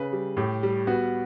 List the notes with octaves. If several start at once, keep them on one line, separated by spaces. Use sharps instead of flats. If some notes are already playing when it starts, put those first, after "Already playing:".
Already playing: C#3 B4
G3
A2 G4
G3
B3 F#4